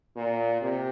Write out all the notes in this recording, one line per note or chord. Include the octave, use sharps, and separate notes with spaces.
A#2
C3